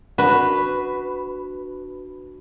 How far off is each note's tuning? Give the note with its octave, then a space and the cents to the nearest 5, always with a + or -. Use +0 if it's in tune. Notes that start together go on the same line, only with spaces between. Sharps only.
D4 +15 F#4 +0 B4 +0